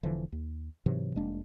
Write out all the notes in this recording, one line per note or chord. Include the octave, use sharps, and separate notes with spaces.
E1 D3 E3 F3
D#2
G#2 C3 E3 F#3
F1 G#3 A#3 D4